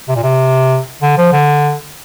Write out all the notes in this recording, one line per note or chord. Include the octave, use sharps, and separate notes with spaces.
C3
A#2
C3
D3
F3
D3